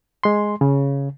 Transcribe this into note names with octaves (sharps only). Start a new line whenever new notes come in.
G#3 C6
C#3